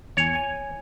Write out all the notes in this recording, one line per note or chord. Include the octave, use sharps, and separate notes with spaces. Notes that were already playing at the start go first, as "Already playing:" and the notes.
E2 C#5 G#5
G#5